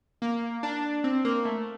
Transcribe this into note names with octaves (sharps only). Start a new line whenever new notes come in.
A#3
D4
C4
A#3
A3